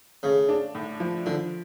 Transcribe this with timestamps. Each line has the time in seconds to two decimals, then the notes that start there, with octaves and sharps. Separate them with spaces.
0.23 C#3 A3
0.49 D4
0.75 A2
1.00 F3
1.26 D3 F3